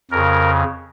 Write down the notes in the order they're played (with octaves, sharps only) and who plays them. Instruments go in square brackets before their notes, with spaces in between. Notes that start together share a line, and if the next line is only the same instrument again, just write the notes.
[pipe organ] F2 C#3 A#4